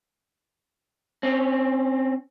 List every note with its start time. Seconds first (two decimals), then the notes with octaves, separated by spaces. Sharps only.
1.23 C4 C#4